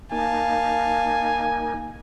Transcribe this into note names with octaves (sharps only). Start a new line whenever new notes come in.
A#3 D#4 F5 G#5 A5